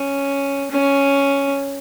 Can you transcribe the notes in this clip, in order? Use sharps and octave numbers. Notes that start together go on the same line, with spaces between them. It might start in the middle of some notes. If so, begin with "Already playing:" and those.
Already playing: C#4
C#4